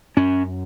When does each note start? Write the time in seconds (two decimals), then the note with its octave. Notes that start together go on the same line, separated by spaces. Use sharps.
0.17 F#2 C#4